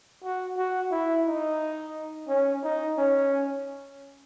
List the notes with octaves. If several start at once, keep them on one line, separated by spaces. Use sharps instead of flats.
F#4
F#4
E4
D#4
C#4
D#4
C#4